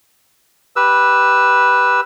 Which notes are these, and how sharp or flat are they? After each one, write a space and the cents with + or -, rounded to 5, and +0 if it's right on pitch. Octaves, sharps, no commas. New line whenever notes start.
G4 +0 B4 -5 E6 +0